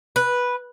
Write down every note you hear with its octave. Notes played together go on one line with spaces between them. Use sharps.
B4